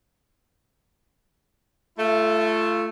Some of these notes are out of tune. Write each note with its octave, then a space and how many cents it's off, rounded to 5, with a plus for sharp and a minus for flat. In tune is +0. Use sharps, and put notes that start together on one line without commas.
A3 +0 F4 -30